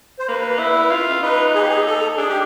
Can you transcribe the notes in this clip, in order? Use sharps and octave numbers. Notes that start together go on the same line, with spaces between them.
C5
A#3 B4
E4
F4
D#4 B4
G#4
G4
G#4
A4
D4 G#4
G4